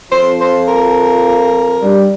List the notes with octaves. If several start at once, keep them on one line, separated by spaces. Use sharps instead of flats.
F2 F3 C5
C5
A#4
G2 G3